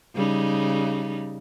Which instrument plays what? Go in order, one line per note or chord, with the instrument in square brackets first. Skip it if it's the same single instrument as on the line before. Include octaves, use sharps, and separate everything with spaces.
[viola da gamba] C#3 G3 D#4